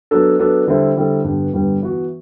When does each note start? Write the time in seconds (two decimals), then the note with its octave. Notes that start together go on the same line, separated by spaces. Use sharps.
0.11 F#3 B3 D4 A4
0.39 F#3 B3 D4 A4
0.67 D3 G3 C4 E4 A4
0.97 D3 G3 C4 E4 A4
1.24 G2 D3 G3 B3
1.53 G2 D3 G3 B3
1.82 E3 B3 F#4